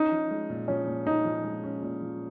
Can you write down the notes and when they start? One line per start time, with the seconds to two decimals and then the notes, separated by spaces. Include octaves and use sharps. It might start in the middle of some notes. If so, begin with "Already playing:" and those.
Already playing: C#4 D#4
0.12 F3
0.31 G#3
0.50 A#2
0.68 F3 C#4
0.87 A#2
1.06 C#4 D#4
1.25 F3
1.44 G#3
1.63 C#4
1.82 A#2
2.01 F3